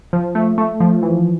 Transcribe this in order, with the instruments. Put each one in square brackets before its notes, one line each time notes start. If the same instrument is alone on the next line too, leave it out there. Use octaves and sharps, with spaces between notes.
[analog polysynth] F3
A3
A3
F3
E3